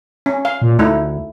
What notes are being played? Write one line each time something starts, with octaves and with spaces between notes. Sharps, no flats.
C#4
F5
A#2
D2 A3 D#4 E4